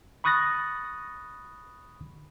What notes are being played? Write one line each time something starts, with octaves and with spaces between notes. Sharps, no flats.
B5 C#6 D#6 F#6 A6 A#6